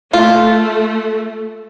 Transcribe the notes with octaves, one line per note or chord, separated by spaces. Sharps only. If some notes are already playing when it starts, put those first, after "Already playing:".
A3 F4